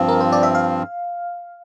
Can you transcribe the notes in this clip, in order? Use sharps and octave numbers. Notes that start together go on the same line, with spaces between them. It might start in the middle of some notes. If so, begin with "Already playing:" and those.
Already playing: G2 F3 C4 F5
A#4
C5
D5
E5
F5